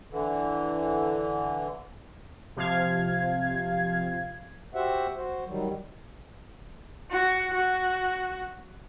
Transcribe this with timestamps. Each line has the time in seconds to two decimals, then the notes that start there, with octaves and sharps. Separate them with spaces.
0.11 D3 E3
2.56 C3 F3 F5 G#6
4.75 F#4 G4 C5 E5 F#5
5.16 F#4 C5
5.47 D#3 F#3 G3
7.12 F#4
7.54 F#4